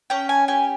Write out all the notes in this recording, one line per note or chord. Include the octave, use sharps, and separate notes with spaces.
C#4 G5
G#5
G4 G#5